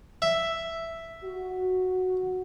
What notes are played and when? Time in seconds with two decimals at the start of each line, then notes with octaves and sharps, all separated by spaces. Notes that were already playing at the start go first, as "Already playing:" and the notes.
0.22 E5
1.24 F#4